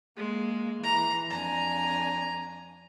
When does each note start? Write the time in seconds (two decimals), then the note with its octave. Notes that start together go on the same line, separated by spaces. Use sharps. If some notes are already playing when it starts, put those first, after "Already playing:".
0.17 G#3 A#3
0.84 E3 A#5
1.31 F2 D4 G#5 A#5